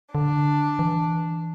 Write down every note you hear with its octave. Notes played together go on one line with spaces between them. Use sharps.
D3 D4
E3